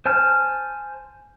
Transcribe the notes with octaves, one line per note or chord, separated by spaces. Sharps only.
C5 G#5 A5 F6 G6